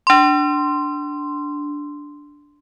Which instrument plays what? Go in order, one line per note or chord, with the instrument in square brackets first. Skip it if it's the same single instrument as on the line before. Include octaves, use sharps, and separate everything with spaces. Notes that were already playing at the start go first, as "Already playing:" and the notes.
[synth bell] D4 C6